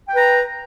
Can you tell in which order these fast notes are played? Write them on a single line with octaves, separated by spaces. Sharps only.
G5 B4 A#5